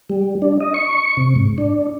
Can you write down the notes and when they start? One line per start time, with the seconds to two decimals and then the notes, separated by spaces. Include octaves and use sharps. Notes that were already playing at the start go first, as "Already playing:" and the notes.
0.09 G3
0.42 D4
0.61 D#5
0.74 C#6
1.17 C3
1.36 G#2
1.58 D4